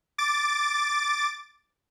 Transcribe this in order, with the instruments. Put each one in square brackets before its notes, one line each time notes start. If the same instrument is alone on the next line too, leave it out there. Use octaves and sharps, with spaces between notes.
[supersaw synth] D6 A6